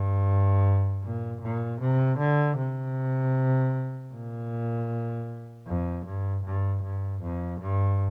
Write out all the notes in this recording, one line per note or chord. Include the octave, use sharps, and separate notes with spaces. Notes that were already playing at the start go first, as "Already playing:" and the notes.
Already playing: G2
A#2
A#2
C3
D3
C3
A#2
F2
G2
G2
G2
F2
G2